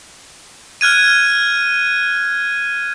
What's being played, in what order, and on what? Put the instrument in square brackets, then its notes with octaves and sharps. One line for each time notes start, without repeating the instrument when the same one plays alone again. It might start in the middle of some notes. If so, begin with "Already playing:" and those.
[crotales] F6 F#6 G#6 D#7